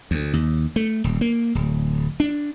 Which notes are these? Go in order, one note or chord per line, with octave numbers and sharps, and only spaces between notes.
D2
D#2
A3
D#1
A#3
D1
D4